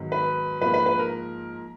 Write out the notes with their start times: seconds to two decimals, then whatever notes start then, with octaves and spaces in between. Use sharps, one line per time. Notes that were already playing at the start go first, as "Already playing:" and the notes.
Already playing: G#2 D#3 F#3 B3
0.12 B4
0.61 G#2 F3 A#3 B4
0.74 B4
0.86 B4
0.99 A#4